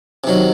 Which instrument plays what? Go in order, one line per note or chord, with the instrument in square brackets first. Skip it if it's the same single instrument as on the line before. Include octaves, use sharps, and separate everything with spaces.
[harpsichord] C3 D#3 F#3